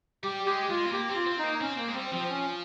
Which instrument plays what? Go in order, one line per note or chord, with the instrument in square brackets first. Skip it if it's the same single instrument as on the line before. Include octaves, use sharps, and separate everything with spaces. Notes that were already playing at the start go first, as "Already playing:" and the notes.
[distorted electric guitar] G3 [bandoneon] G4
[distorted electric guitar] G#3 [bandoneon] G4
[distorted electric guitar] G#3 [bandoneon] F4
[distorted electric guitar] C4
[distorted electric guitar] A#3 [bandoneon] G4
[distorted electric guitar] C4
[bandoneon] F4
[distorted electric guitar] C4
[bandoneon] D#4
[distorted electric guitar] A#3
[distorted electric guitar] C4 [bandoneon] C#4
[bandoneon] A#3 [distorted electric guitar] C4
[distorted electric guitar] G#3
[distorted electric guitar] G3 [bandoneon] C4
[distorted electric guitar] F3 [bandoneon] C4
[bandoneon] C#4